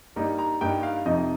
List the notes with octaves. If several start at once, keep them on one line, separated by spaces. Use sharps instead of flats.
G2 G3 A#3 D#4
A#5
G2 G3 A#3 D#4 G5
F5
F2 C3 F3 D#4 D#5